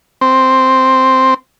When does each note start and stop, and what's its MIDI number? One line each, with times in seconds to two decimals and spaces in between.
0.21 1.34 60